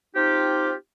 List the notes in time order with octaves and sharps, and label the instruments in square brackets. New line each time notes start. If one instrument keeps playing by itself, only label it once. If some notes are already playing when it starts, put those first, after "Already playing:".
[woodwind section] C4 D#4 F4 G4